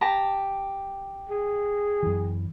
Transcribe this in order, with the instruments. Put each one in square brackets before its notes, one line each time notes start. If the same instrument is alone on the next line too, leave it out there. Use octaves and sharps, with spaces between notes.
[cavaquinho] G4 A5 A#5
[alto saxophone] G#4
[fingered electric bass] F#2 E3